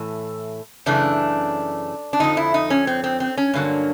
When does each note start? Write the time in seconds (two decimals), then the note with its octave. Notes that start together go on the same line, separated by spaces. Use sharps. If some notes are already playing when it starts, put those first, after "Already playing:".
Already playing: A2 E3 A3
0.86 F#2 C#3 E3 A3 D4
2.13 D4
2.20 F2 D3 F3 D#4
2.37 E4
2.54 D#4
2.70 C#4
2.87 C4
3.04 C4
3.20 C4
3.38 C#4
3.54 G2 D3 F#3 A#3